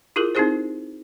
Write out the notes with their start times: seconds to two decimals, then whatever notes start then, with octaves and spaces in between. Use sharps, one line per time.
0.16 E4 F4 G4 G#4 A#4
0.35 C4 D#4 E4 G4 G#4 C5